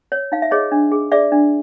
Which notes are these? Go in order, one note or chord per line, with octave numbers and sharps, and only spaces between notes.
C#5
D#4 F5
E5
G#4 C#5 D#5
D4
G#4
G#4 D5 E5
D4